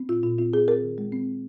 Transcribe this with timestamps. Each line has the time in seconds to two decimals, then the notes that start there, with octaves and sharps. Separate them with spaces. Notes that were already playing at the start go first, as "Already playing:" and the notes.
Already playing: C4
0.09 A#2 F4
0.23 A#2 F4
0.38 C4 F4
0.53 C4 G#4
0.68 C4 A#4
0.83 D#3
0.98 G#3
1.12 C4